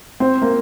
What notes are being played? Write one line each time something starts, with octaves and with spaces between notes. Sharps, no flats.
C4
A#3